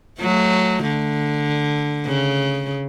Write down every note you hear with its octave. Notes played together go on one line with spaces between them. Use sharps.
F#3 A3
D3
C#3